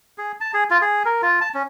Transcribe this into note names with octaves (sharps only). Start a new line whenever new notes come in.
G#4
A5
G#4
F4
G#4
A#4
F4
A5
C#4